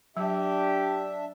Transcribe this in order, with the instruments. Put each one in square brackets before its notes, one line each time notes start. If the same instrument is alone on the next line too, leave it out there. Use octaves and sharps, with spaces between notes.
[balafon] F#3 [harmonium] D4 E5 [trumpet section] G4